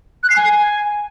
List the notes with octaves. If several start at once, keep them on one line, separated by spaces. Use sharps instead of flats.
F#6
C7
G#5